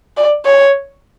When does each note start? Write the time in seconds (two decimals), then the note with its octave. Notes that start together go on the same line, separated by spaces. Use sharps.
0.17 D5
0.45 C#5